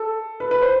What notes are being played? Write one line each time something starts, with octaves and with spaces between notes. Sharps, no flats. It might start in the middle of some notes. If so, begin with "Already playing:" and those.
Already playing: A4
B4
B4
C5